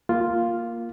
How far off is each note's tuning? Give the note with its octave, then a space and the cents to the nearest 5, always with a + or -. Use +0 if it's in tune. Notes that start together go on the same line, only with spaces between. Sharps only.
A#3 +0 F4 +0